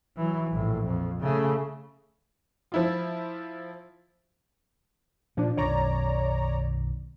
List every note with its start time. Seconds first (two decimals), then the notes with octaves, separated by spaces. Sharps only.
0.17 E3 F#3
0.51 A#1 A2
0.86 F2
1.21 C#3 A3
2.72 F3 E4 F4
5.37 A#2 F3 D4
5.57 B1 F#2 D#3 C#5 D5 A#5